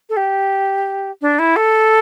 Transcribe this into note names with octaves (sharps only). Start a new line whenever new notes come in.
A4
G4
D4
E4
A4